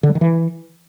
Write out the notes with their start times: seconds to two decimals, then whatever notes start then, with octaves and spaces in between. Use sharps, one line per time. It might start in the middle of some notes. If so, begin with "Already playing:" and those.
0.03 D3
0.09 G3
0.15 D#3
0.21 E3